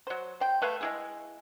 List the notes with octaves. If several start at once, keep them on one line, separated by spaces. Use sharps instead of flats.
F#3 C5
C5 G5
A3 B4 C#5 F5
G#3 E4 G#4